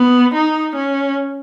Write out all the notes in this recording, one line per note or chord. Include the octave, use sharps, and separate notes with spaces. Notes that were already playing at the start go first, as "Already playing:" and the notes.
Already playing: B3
D#4
C#4